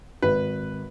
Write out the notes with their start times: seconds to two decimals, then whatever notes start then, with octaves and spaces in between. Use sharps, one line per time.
0.22 G#1 B4